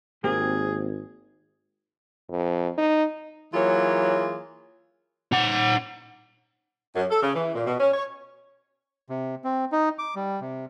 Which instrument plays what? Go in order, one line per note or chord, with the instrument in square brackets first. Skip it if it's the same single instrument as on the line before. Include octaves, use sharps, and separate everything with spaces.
[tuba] G#1 [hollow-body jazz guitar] A#3 C4 G4 [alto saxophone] G#4
[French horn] F2
D#4
[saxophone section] E3 F#3 A#3 F4 G#4 C#5
[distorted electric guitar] D#4 F#5
[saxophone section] F#2
A4
C#3
E3
A#2
B2
C#4
C#5
[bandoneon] C3
C4
D#4
D6
G3
C3